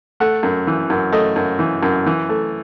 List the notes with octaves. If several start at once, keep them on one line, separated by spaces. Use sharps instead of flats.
A3 F#5
F#2
E3
F#2
A3 D#5
F#2
E3
F#2
E3
A3